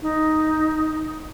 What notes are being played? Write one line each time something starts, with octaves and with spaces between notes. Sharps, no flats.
D#4